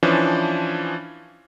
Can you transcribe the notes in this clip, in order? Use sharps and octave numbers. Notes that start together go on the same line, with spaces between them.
E3 F3 C#4 D4